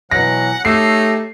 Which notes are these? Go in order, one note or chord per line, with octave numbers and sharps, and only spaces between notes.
B2 E3 F#3 F#5 A#6
A3 D#4 G4 A4 C#5 C7